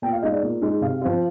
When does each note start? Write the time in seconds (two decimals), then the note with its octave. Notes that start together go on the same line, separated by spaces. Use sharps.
0.02 A#2 G5
0.13 F5
0.22 G#3 D#4 D#5
0.32 D5
0.43 A#2
0.61 G#3 D#4
0.81 C3 F5
1.01 F3 C4 F4